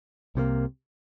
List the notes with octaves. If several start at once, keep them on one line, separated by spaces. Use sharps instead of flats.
C2 C3 D#3 A#3